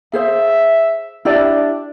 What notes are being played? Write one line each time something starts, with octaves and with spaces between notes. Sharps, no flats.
G#4 C5 E5 F5
D4 E4 G4 D5